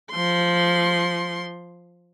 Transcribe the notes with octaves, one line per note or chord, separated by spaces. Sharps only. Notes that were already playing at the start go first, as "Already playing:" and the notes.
F3 C6